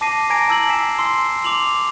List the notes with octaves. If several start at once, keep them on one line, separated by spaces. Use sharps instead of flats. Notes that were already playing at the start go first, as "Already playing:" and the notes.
A5 D6 A#6 C7 D#7
G#5 A#5 G#6 A#6 D7
A5 D6 E6 G#6 F#7
G#5 B6 C7 E7
C6 E6 C7
D6 F7 F#7